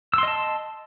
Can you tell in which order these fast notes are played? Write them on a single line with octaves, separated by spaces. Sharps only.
E6 C6 D#5 A5